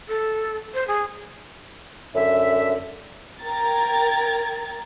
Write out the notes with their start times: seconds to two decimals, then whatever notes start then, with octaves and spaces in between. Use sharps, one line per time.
0.08 A4
0.74 C5
0.88 G#4
2.15 F#2 D3 E5
3.41 A#4 G5 A#5 G#6 A6